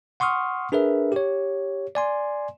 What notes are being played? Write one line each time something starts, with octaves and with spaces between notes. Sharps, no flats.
F#5 C6 C#6 D#6 F6
D4 G#4 A#4 B4 E5
G4 C#5
D5 G#5 C6